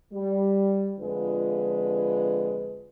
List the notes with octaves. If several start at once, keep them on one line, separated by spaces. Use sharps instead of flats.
G3
F2 D3 G#3 F4 B4